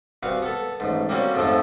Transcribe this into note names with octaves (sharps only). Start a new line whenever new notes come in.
C2 F#4 B4 F5
B3 A4
A1 G#2
G3 A#3 C4 C#4 F#4
F2 G#2 C3 F3 A3